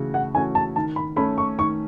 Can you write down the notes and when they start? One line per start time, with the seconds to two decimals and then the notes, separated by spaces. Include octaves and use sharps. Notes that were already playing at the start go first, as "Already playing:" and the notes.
Already playing: C#3 E3 A3 F#4
0.14 F#5
0.34 E3 A3 C#4 F#4 G#5
0.55 A5
0.76 D#3 A5
0.96 B5
1.16 A3 C#4 B5
1.38 C#6
1.58 D#3 C#6